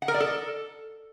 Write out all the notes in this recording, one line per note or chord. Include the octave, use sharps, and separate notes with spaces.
F#5
A#4
D5
A4